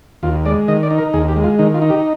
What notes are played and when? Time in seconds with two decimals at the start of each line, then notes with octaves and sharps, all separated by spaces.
0.23 D#2 F4
0.46 G#3 D5
0.68 D#3 D#5
0.83 D5
0.91 D#4
0.98 A#4
1.13 D#2 G#4
1.28 G4
1.36 G#3
1.44 F4
1.59 D#3 D#4
1.74 F4
1.82 D#4
1.90 G4